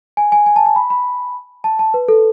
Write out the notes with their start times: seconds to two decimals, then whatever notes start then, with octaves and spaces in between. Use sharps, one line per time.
0.17 G#5
0.32 G#5
0.46 G#5
0.56 A5
0.66 A5
0.76 B5
0.90 B5
1.64 A5
1.79 A5
1.94 B4
2.08 A4